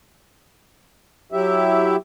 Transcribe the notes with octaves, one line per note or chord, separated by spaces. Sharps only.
F#3 E4 G4 E5